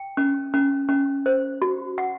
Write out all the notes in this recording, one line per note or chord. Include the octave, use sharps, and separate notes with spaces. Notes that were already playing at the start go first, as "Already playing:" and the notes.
Already playing: G5
C#4
C#4
C#4
C5
F#4
F#5